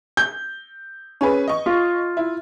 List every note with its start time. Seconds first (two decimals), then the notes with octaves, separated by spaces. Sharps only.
0.17 G6
1.21 C#4 G#4 B4
1.48 D#5 C#6
1.66 F4
2.17 E4